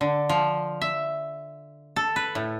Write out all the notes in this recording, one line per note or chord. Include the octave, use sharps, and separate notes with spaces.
D3
F3
E5
A4
B4
A2